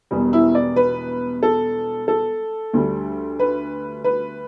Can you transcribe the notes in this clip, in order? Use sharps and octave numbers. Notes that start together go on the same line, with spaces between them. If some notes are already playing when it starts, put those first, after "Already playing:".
E1 E2 B2 G3
E4
D5
B4
A4
A4
D2 D3 G3
B4
B4